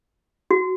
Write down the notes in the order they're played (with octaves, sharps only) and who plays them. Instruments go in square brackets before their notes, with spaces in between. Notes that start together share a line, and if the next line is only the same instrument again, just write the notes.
[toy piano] F#4